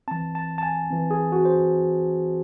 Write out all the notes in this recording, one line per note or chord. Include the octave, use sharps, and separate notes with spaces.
E3 C4 A5
A5
A5
G#5
E3 C4
G#4
F#4
C5